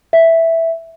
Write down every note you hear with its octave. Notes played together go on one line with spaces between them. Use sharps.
E5